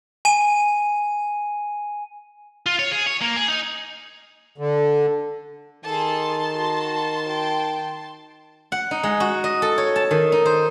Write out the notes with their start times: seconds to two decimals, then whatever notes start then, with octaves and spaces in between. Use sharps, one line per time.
0.25 G#5 D#7
2.66 F4
2.79 C#5
2.92 G#4
3.07 C#5
3.21 A#3
3.36 G#4
3.48 D#4
4.58 D3
5.85 D#3 G#4 A4 A5 C6
6.54 F#4
7.28 G5
8.72 F#5
8.91 D#4
9.03 G#3
9.20 F#4
9.44 D#5
9.62 A4
9.78 C#5
9.96 A5
10.11 D#3
10.32 D#4
10.46 C5